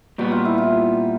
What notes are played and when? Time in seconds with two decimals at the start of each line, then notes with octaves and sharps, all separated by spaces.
0.18 A#2 G3 B3 F#4
0.32 F4
0.45 E4
0.58 F4